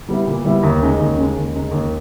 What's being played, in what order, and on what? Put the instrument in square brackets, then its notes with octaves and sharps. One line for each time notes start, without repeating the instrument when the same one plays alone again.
[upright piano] G3 B3 E4
A#2
G3 B3 E4
D#2
C#3 G#3 D#4
D#2
C#3 G#3 D#4
D#2
C#3 G#3 D#4
D#2